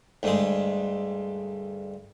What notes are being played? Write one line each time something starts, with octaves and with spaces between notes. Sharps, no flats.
D2 G2 G#3